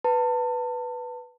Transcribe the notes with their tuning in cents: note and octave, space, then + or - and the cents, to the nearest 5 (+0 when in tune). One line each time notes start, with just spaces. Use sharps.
B4 +0 A5 +30